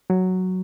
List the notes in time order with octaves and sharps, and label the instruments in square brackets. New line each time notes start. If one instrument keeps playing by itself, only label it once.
[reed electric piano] F#3